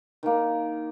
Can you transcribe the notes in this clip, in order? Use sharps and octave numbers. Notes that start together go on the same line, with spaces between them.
D#3 A#3